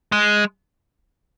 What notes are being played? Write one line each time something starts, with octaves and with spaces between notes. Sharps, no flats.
G#3